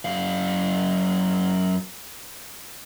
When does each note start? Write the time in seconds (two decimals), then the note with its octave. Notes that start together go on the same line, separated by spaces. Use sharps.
0.05 F#2 F5